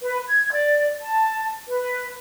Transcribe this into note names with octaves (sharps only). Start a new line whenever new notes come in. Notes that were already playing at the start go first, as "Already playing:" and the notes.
B4
G#6
D5
A5
B4